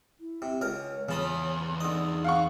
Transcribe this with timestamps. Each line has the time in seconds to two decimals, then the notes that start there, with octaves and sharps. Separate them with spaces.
0.20 E4
0.42 C3
0.61 C#2 A#4 C#5
1.09 E2 C#3 A5 B5 D#6
1.80 D3 D#4 D#5
2.24 F5 F#5 C#6